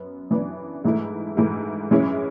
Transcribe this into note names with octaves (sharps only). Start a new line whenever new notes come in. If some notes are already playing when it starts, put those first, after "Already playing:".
Already playing: F#2 B3
F#2 E3 B3 D4
G#2 E3 A3 E4
G#2 E3 A3 E4
F#2 E3 G#3 C#4 E4